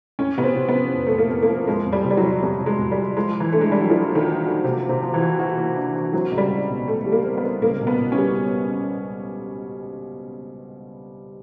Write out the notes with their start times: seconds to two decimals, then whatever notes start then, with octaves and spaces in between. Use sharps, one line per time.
0.19 F2 C#4
0.37 C3 B3
0.44 C4
0.56 C3
0.68 B3
0.74 F3
0.94 F2
1.07 F2 A3
1.18 A#3
1.30 F2
1.43 A#3
1.49 F3
1.67 F2 G#3
1.86 F2
1.92 G3
2.04 C3
2.10 G3
2.17 F#3
2.23 F2
2.42 F2 G3
2.60 C3
2.66 G#3
2.78 F2
2.91 G3
2.98 F3
3.17 F3 G#3
3.34 F3
3.40 E3
3.52 A3 D4
3.61 G#3
3.72 G3 D4
3.81 F#3
3.90 F3 F#4
4.09 A#3
4.15 D#3
4.27 F3
4.46 F#4
4.64 C3 A#3
4.83 A#3
4.89 C3
5.02 F3
5.14 E3
5.20 F#4
5.40 F#4
5.57 A#3
5.76 D4
5.95 F#4
6.13 F#3 C4
6.31 C#2
6.38 G3
6.50 C#2
6.69 B2
6.88 B2 A3
7.06 G3
7.12 A#3
7.24 C4
7.37 B3
7.43 C4
7.62 C#2 A#3
7.80 B2
7.87 B3
7.98 B2
8.12 C#4
8.17 G3